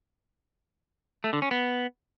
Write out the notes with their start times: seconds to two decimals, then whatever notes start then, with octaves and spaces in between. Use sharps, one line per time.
1.24 A3
1.33 D3
1.42 C#4
1.51 B3